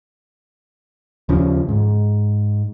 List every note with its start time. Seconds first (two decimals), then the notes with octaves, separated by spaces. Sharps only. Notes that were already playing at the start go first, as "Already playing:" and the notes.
1.29 D#2 C#3 F3
1.69 G#2